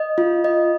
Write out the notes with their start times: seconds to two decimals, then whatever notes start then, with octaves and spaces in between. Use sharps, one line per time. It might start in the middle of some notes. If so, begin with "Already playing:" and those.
Already playing: D#5
0.18 F4
0.44 D#5